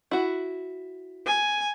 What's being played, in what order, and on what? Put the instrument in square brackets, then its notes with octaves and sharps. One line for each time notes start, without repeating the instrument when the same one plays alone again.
[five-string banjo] E4 F#4
[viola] G#5